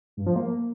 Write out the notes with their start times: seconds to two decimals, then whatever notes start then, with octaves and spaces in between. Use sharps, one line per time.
0.17 G2
0.27 F3
0.36 A#3